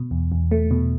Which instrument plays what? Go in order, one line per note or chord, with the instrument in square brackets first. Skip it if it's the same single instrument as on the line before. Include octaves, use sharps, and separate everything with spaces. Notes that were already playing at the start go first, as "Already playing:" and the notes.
Already playing: [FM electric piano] B2
E2
E2
A3
B2